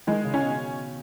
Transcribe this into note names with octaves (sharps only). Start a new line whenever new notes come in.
D#3 G#3
C#3
C#4
B2